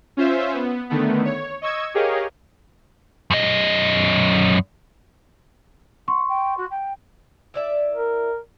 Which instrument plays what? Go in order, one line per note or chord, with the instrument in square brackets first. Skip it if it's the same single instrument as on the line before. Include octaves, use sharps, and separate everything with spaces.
[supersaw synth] C#4 F4 C5 E5
B3
D3 D#3 A3 B3
C#5
D#5 C#6 E6 G#6
G4 G#4 A#4 C#5 D#5 F5
[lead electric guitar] F#2 D#5
[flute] F#5 [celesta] C6 C#6
[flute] G5
F#4
G5
[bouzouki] E4 D5 E5
[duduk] A#4